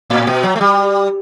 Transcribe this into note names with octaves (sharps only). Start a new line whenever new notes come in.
A2
B2
F#3
A3
G3